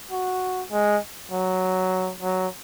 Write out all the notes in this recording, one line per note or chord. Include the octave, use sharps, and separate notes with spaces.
F#4
G#3
F#3
F#3